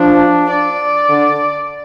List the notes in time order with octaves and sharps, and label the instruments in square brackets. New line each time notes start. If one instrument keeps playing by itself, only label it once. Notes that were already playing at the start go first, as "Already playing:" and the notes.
Already playing: [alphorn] F3 [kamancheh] D4
[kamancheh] D5
[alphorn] D3